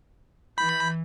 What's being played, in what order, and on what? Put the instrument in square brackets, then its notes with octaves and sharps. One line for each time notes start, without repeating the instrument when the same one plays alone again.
[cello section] E3 [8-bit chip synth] B5 [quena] G6